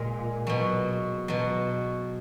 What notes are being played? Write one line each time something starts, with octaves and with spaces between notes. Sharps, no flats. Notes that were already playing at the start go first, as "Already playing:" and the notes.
Already playing: A#2 G#3
B2 F#3
B2 F#3